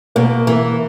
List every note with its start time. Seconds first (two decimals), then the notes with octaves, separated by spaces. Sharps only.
0.16 B2 A#3
0.47 E3 A#3